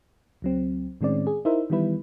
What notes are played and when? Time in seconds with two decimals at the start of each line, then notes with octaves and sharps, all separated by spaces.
0.42 C#2 F#3 C4
1.01 A2 D#3 G#3 C4 C#4 D5
1.27 G#4
1.45 D#4 E4 A#4 C5 E5
1.70 D#3 E3 G3 B3 E4 B4